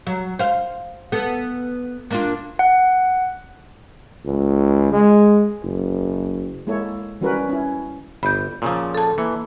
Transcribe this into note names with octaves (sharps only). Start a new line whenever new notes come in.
F#3
C5 F5
B3 A4
A#3 D4 F4
F#5
C#2
G#3
F#1
G#3 A#3 E4 A4 C#5
E3 G3 C#4 F#4 A#4 B4
C#4 E4
G1 B5 G6
A#2 C#3 F3
A4 A5
E3 A#3